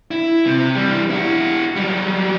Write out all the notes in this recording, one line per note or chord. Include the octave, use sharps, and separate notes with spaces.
E4
C3
E3 G3
E4 F#4
F#3 G3